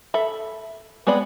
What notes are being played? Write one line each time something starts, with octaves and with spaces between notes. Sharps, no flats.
A4 E5 B5
G#3 B3 C4 D5 B5